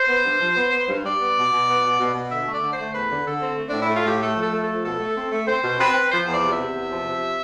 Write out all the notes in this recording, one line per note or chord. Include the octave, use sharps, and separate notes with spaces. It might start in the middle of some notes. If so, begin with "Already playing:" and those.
Already playing: C5
B3
G2
F3
B3
B3
G2
G3 D5
B3
B2
B2
B3
B2
B2
B2
D3 E5
A3
D5
D3
C5
A3
E2 B4
D3
D3 A4
C4
A3
A2 D4
E4
A3
F4
A2 G4
A3 A4
F3
A4
A3
F3 A4
B2 A4
A3
C4
A3
C4 C5
B2
C4 B4
C4
F3 C5
E2
D5
C3
E5
C3
E2
F3
C3